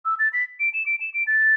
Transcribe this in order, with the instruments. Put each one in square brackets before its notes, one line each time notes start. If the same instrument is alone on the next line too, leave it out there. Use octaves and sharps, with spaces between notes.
[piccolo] E6
A6
B6
D7
E7
D7
E7
D7
A6